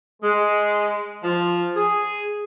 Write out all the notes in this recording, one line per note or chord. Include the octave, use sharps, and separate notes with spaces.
G#3
F3
G#4